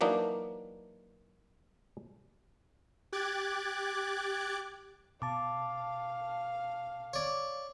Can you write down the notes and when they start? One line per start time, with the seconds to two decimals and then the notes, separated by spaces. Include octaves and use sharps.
0.01 E3 F#3 A#3 D4 D#4
3.12 G4 D6 F#6 G#6 A6
5.22 B2 F5 A5 D6
7.13 C#5 D5